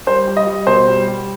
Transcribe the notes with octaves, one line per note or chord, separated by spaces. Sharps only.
G3 C5
G3
D#5
G3
B2 C5
G3
G3